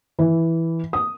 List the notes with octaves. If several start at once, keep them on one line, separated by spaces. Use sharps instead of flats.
E3
D#6